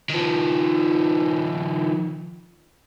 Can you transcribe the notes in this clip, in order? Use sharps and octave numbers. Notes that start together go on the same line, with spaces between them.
D#3 F3